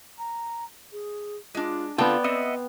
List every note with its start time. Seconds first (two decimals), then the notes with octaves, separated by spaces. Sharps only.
0.18 A#5
0.92 G#4
1.55 G#3 D4 F4
1.98 D3 B3 C4 F4 D5 G5 A5
2.24 C4 D#5 E5 F#5